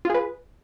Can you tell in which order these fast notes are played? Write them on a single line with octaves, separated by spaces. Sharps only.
F4 G#4 B4